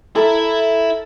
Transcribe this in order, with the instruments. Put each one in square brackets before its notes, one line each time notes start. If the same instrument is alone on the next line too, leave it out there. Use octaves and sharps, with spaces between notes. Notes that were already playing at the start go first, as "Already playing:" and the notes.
[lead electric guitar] E4 E5 [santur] A4 A#4